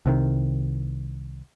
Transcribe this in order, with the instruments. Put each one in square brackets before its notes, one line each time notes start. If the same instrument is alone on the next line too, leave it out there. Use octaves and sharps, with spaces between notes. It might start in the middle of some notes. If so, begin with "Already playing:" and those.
[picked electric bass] C2 C3 D#3